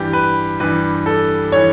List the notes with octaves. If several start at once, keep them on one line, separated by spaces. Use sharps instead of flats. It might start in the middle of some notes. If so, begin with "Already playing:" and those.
Already playing: G2 E3 G4
B4
G2 E3 B4
A4
E3 C#5